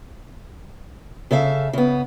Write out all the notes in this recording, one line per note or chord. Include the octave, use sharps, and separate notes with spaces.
C#3 A4 E5 F5
C#3 B3